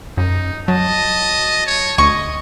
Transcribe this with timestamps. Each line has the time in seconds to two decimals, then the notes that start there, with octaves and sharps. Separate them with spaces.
0.17 F#2 D#4
0.68 F#3 D#5 A5
1.67 C#5
1.98 D2 D#5 C#6